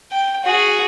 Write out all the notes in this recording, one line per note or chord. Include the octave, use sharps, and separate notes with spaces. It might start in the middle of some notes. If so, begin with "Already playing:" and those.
G5
F#4 G#4